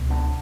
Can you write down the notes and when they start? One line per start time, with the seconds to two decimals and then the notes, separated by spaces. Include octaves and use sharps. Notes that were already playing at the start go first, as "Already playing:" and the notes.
Already playing: C#2 B2
0.10 B3 D4